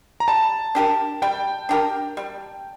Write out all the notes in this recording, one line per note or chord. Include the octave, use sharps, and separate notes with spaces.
A#5
G3 A5
D4 G4 A#4
G3 G5
D4 G4 A#4
G3